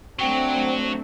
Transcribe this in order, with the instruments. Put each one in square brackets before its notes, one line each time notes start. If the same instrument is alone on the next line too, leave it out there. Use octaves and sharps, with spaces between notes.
[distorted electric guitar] F#3 [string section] A3 C4 D4 [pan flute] G5